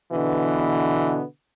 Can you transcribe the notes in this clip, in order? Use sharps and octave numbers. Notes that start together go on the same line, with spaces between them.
B2 D3 E3 B3